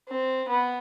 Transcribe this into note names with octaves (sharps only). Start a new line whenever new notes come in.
C4
B3